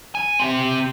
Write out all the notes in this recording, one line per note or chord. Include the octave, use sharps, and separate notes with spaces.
G#5
C4 G4